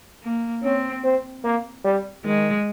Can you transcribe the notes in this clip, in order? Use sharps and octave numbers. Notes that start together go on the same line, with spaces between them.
A#3
C4 C#4
C4
A#3
G3
D#3 G#3